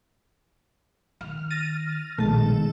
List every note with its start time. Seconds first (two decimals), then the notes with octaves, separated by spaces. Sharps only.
1.21 D#3 F6
1.50 A6 A#6 D#7
2.18 A#1 B2 D#3 G#3 A3 A5